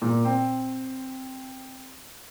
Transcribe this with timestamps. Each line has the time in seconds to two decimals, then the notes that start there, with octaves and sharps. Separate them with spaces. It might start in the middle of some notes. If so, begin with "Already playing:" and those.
0.02 A#2
0.25 C4